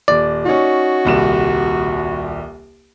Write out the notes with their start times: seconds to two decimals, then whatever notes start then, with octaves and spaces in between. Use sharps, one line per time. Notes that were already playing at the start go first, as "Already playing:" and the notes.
0.08 D#1 D5
0.45 C#4 D#4 F#4
1.05 D#1 C2 E7